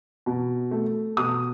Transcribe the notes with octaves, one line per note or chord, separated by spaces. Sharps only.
B2
A3
B2 D#6